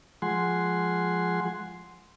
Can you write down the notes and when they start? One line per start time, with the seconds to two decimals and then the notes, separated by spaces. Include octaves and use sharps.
0.22 F3 G#3 F#5 G#5 C6